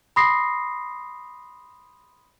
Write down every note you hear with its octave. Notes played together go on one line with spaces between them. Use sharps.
B5 C6 D#6 A#6 C7